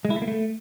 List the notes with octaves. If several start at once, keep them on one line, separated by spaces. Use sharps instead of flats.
G#3
E4
A3
A#3
A3